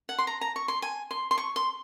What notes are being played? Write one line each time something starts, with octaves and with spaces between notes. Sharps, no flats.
F#5
C6
A#5
A#5
C#6
C6
G#5
C6
C6
C#6
C6